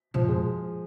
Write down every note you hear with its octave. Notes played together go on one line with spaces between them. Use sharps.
C3 F3
F2
G#3